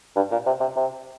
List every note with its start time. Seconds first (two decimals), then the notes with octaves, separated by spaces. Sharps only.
0.16 G2
0.31 A#2
0.46 C3
0.61 C3
0.76 C3